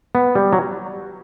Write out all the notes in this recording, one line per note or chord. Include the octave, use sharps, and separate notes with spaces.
B3
G3
F#3